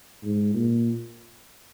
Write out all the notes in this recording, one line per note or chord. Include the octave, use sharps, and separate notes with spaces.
G#2
A#2